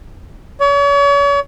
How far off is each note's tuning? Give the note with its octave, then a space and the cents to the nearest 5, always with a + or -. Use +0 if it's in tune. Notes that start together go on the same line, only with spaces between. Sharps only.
C#5 +40